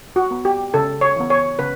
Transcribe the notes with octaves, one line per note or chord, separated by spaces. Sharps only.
F#4
B3
G4
C#3 A4
C#5
E3 B3
C#5
C#3 B4